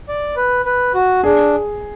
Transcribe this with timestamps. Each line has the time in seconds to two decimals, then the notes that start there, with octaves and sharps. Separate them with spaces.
0.08 D5
0.37 B4
0.66 B4
0.94 F#4
1.24 D4 G#4